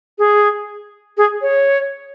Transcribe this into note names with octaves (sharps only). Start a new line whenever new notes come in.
G#4
G#4
C#5